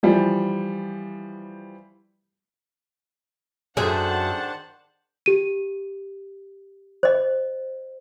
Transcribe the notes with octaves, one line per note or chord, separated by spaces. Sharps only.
E3 F3 G3
F#2 D#3 D4 G#4 C5 E5 F#5 A5
G4 D#7
C5 D#5